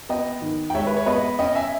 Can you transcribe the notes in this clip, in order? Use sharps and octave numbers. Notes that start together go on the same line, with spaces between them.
B3 D#5 G5
D#3
G5
G#3 C#5 E5
B4
C#5
B3 B4 D#5
C#4 D#5 G5
E5 G#5